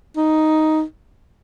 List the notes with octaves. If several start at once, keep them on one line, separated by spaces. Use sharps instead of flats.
D#4